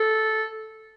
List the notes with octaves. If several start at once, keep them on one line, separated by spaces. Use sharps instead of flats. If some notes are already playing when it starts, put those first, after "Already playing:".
Already playing: A4